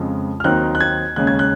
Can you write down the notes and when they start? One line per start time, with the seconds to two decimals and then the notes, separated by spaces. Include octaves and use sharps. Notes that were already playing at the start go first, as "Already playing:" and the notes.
Already playing: F2 C#3 F3 G#3
0.40 F6
0.44 D#2 D#3 F#3 C4 D#4 F#6
0.75 F#6
0.80 G#6
1.16 D#2 C#3 G#3 C#4 F#6
1.27 G#6
1.39 F#6